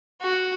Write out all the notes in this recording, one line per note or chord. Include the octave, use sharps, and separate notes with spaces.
F#4